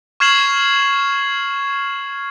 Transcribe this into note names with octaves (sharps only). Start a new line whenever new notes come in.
C#6 F6 G#6 C7 E7 F#7